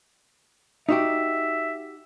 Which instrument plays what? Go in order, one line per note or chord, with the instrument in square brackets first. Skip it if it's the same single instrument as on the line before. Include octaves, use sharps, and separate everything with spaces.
[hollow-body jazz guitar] D#4 F#4 G4 [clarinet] E5